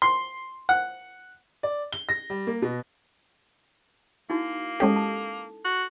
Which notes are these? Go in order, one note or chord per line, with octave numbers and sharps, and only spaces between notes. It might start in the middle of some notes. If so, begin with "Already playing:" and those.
C6
F#5
D5
G7
A#6
G3
A#3
B2
A#3 D#4 E4 F#4
G#3 C#4 G4 A4 A5
A5
F#4